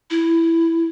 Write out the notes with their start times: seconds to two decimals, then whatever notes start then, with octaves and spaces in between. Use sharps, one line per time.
0.10 E4